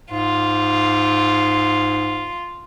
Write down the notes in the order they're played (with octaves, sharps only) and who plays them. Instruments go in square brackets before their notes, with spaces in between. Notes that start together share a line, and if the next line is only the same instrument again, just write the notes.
[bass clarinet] G#2 [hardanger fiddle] F4